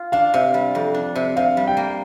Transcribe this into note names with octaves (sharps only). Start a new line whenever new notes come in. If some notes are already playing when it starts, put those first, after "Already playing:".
Already playing: F4
D4 F5
C3
G3
F2
D4
C3
C3 F5
G3
G5
A#3